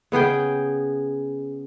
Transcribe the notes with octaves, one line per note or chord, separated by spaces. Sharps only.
C#3 B3 G#4 G5